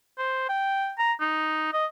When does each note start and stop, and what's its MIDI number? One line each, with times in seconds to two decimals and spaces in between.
0.18 0.45 72
0.49 0.92 79
0.99 1.13 82
1.21 1.70 63
1.73 1.86 75